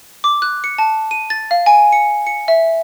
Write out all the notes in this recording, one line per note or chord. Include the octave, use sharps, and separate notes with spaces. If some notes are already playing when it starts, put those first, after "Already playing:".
D6
F#6
C#7
A5
D#7
A6
F5
G#5
C#7
C#7
E5